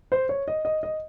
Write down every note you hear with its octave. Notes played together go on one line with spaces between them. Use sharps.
C5
C#5
D#5
D#5
D#5